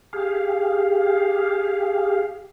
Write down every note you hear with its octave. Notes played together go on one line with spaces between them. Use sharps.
G4 G#4 F5